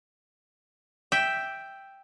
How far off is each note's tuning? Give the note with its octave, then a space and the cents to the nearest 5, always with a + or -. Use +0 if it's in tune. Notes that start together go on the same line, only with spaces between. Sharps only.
E5 +0 G5 +0